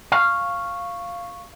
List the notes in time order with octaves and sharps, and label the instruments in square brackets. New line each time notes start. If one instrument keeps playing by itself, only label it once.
[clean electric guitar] F5 [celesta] C#6